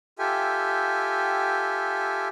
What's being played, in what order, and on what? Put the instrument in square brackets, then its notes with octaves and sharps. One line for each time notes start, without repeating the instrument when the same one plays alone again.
[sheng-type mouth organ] F4 G4 A4 E5 G5 G#5